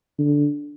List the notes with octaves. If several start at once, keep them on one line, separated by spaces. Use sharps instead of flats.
D3